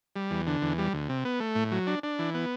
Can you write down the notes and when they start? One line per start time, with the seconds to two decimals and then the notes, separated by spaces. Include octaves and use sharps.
0.16 G3
0.31 E2
0.47 D3
0.62 E2
0.78 G3
0.93 D2
1.09 C3
1.25 B3
1.40 A3
1.55 A2
1.71 F#3
1.87 D4
2.03 D4
2.19 E3
2.34 B3